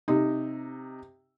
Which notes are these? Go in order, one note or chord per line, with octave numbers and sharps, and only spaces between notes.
C3 D#4